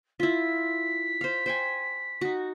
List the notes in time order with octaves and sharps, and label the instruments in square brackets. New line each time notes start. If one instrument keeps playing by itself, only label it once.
[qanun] E4 F4 [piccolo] B6
[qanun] C5 F5
C5 G5 G#5
D#4 F#4